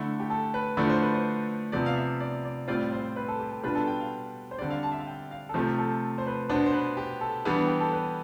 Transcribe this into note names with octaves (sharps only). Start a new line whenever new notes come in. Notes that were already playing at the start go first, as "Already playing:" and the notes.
Already playing: D3 A3 E4
G4
A4
B4
D3 F3 A3 E4 D5
C5
B4
C5
C3 F3 B3 D5
F5
E5
D5
D5
A2 G3 C4 F4 D5
C5
B4
A4
G4
A4
B2 G3 D4 F4 B4
A4
G5
F5
C5
D3 G3 C4 D5
F5
A5
E5
F5
G5
F5
A4
C3 F3 A3 C4 G4
A4
C5
B4
B2 B3 D4 C5
C5
B4
G4
A4
E3 G3 B3 D4
G4
A4
B4